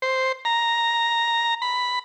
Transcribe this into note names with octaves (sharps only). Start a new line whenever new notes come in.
C5
A#5
B5